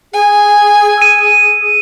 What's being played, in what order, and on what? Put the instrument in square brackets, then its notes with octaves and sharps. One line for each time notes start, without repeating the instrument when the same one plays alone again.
[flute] G#4 [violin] G#5
[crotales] E6 D#7